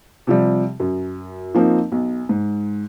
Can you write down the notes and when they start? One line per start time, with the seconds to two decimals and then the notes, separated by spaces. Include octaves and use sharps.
0.27 C3 F3 G3
0.80 F#2
1.54 F3 A#3 C4 D#4
1.92 B1
2.29 G#2